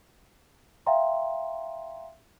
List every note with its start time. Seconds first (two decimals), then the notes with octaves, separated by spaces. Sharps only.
0.86 E5 F5 G5 A#5 C6